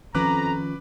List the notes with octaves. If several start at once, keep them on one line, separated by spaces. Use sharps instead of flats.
F2 D#3 F3 C#4 B4 A#5 D6 F#6